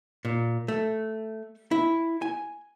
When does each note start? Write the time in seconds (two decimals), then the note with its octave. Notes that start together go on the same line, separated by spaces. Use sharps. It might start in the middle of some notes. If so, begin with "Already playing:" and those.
0.25 A#2
0.68 A3
1.71 E4
2.22 G#5